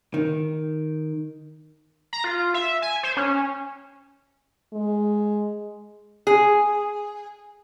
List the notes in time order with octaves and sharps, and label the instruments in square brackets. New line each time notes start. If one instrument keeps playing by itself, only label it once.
[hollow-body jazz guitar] D#3
[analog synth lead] A#5
F4
E5
G#5
C5
C#4
[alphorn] G#3
[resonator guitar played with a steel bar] G#4